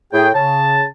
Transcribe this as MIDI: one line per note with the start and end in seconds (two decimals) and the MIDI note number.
0.12 0.29 45
0.12 0.29 68
0.12 0.29 79
0.34 0.84 49
0.34 0.84 81